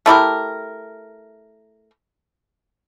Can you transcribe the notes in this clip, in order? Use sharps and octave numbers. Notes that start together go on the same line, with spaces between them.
A3 E4 G4 A#4